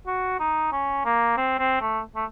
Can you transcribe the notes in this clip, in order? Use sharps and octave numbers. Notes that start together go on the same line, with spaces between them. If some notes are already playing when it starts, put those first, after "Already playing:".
F#4
D#4
C#4
A#3
C4
C4
A3
A3